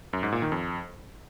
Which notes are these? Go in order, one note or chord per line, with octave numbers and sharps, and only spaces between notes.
F#2
G#2
A#2
D#3
F2